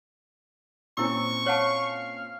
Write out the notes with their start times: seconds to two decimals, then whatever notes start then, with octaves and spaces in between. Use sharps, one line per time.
0.97 A#2 C4 C#4 E4 C#6 E6
1.46 C#5 F5 F#5 A5